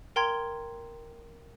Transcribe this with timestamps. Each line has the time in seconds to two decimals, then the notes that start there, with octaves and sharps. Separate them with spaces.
0.16 A#4 G5 A#5 C6 G#6